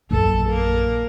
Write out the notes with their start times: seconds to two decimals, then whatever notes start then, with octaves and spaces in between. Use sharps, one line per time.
0.11 A#1 F#2 A4
0.49 A#3